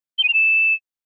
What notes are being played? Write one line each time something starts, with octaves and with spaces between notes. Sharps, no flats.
G7
D#7
F7
E7